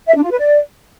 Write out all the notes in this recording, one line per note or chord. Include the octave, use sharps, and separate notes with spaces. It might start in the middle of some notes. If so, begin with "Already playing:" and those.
E5
D4
F4
B4
D5